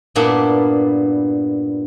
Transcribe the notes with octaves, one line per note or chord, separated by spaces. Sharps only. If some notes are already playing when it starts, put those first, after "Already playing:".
G2 A#2 A#3 B3 D4 E4